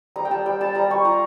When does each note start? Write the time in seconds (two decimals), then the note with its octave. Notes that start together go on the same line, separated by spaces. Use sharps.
0.16 G3 A#5
0.25 G5
0.31 G3 A5
0.46 G3 G5
0.60 G3 A5
0.75 G3 A#5
0.90 G3 C#6
1.05 F4 A#5